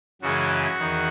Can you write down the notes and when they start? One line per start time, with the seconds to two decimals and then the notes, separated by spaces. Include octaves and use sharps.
0.22 F#2 C#3 E3 G#3 F#4
0.78 E2 D#3